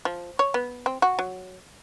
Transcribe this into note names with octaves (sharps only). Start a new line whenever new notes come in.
F3
C#5
B3
C4
F#4
F#3